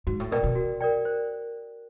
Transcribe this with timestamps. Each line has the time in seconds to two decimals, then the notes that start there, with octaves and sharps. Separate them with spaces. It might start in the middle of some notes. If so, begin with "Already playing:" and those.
0.07 G#2 F#4
0.20 A2
0.31 B2 A#4 D5 G5
0.44 B2
0.55 F#4
0.81 A#4 D5 G5
1.05 C5